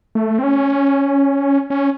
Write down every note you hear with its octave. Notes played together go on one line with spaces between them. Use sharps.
A3
C4
C#4
C#4